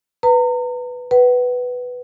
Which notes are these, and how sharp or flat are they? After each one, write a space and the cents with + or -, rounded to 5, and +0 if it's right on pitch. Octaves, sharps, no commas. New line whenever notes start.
B4 +0 A#5 -35
B4 +0 F#5 +35